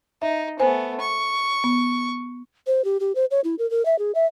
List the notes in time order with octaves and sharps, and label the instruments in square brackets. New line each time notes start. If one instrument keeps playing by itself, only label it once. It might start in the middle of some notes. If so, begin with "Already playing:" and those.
[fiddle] D#4 [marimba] E5
[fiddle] A3 B3 [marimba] C5 G#5
[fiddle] C#6
[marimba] B3
[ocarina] C5
G4
G4
C5
C#5
E4
A#4
A#4
E5
G#4
E5